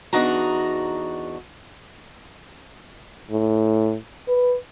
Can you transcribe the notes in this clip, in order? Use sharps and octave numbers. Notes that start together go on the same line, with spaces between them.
E2 D4 D#4 F#4 A#5
A2
B4